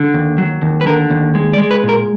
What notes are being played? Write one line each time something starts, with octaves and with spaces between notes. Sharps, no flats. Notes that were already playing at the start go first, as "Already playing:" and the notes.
Already playing: D3
D#2
F#3
D#2
B4
D3 A#4
D#2
G#3
D5
G#3
B4
A#2
A#4